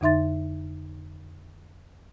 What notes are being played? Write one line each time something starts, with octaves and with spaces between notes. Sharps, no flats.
F2 D3 D#4 E5 C6 A6